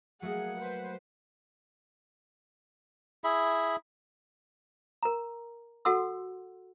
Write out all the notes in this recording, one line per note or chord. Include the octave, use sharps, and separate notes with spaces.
F#3 A3 A#3 G#4 F#5
B4 C5
E4 G#4 E5 B5
A#4 A#5
F#4 A4 F#5 C6 E6